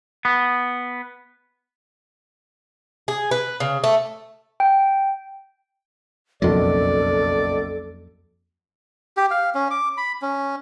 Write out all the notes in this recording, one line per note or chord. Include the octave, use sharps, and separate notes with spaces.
B3
G#4
B4
C#3
A3
G5
F#1 B1 F2 F#3 A4 D5
G4
F5
C#4
D6
B5
C#4